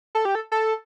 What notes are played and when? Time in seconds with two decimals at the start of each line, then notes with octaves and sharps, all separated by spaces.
0.15 A4
0.25 G4
0.35 A4
0.52 A4